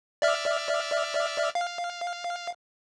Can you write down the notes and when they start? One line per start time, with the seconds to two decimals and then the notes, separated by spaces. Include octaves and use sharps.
0.22 D5 E5 F6
1.55 F5